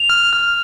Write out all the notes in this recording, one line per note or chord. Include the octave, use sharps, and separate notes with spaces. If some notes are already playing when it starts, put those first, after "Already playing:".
Already playing: F7
F6
F6